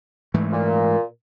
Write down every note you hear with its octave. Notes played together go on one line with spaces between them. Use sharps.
G#2 E3 A3
A#2